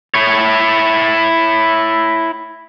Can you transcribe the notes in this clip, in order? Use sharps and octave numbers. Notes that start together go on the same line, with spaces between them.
E4 C#5